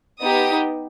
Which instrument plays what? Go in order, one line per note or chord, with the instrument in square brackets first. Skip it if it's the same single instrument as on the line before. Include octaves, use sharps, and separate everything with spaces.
[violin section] B3 D#4 G4 D#6